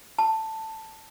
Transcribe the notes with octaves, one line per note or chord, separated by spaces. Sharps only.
A5